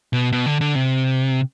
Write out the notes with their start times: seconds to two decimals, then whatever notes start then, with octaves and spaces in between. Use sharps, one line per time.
0.13 B2
0.32 B2
0.46 D3
0.61 D3
0.75 C3